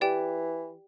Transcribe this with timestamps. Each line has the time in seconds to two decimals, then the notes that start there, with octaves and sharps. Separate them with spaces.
0.01 E3 G4 D5 G5